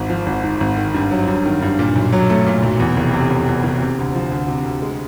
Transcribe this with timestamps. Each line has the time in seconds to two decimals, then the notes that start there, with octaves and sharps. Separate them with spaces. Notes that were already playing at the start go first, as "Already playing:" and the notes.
Already playing: G#1 G#2
0.10 F3
0.26 G#1
0.44 G#2
0.60 G#1
0.77 D#3
0.94 G2
1.11 F#3
1.27 G2
1.46 D#3
1.62 G2
1.79 A#2
1.96 B1
2.13 F#3
2.30 A3
2.47 A#2
2.63 B1
2.80 E2
2.97 F1
3.13 C3
3.31 F1
3.47 E2
3.64 F1
3.81 C3
3.99 D2
4.15 F3
4.31 D2
4.48 C3
4.65 D2
4.82 G#3